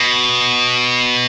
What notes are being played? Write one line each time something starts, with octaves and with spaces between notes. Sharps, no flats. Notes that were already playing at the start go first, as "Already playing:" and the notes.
Already playing: B2